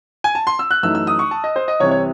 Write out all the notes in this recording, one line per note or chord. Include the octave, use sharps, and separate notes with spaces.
G#5
A5
C6
E6
F#6
F#2 E3 A3 D#4 E6
E6
D#6
C#6
A5
D#5
C5
D#5
C2 C3 E3 C4 C#5
C#5